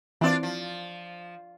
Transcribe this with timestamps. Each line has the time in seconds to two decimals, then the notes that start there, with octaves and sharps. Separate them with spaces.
0.21 E3 C4 D4 F4 D5
0.43 F3